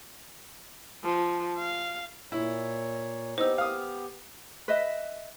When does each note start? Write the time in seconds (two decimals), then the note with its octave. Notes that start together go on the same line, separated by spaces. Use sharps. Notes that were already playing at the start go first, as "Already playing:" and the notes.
1.03 F3
1.58 F5
2.32 A#2 E4 C#5
3.38 B3 D#4 G4 C5 E6
3.58 F5 D#6
4.68 B4 D#5 E5